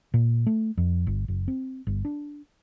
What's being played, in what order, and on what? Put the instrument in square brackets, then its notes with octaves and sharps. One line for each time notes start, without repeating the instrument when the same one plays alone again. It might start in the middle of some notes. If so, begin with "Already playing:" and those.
[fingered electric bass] A#2
A3
F2
G1
F#1
C4
G1
D4